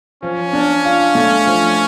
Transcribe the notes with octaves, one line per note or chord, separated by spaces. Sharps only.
F3 C#4
D4
F4
A3
F3